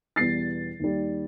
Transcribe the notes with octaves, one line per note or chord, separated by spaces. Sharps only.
E2 B2 G3 A6 C7
D#2 D#3 G3